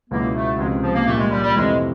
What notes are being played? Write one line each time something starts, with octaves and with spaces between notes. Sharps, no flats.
C#2 B2 F#3 A#3 B3 E4
A3
C#2 C3 F3 G#3
F3
A#3
A#1 A#2 G3 A3
G#3
G3
G3
F2 C3 E3 G#3 A3